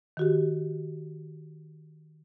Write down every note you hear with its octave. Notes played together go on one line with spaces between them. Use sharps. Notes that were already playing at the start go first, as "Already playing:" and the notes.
D#3 F#4 G4